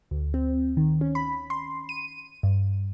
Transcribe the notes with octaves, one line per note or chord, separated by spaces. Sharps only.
D2
C4
D#3
C#4
B5
C6
D#7
G2